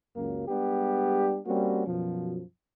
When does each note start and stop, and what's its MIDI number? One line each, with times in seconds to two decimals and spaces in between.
0.16 0.44 37
0.16 0.44 42
0.16 0.44 49
0.16 0.44 54
0.16 0.44 58
0.48 1.39 55
0.48 1.39 56
0.48 1.39 59
0.48 1.39 62
0.48 1.39 67
1.46 1.83 55
1.46 1.83 58
1.46 1.83 60
1.46 1.83 61
1.46 1.83 66
1.87 2.42 42
1.87 2.42 47
1.87 2.42 53